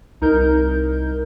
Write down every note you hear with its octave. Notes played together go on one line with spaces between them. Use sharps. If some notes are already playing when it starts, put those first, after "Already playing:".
C2 D#4 A#4 G6